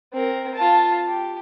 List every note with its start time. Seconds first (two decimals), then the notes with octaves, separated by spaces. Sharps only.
0.13 C4 A#4
0.55 F4 A5
1.07 G4